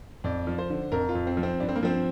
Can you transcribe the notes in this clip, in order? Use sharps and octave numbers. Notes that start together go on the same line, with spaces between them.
F2 D5
F3
C5
D3
F2 A#4
F4
F2
C4
F3
C4
G2 D4
C4
A#3
F3 C4